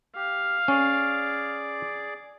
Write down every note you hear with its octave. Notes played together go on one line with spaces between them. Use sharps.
G4 F5
C#4 G#4 D5 D6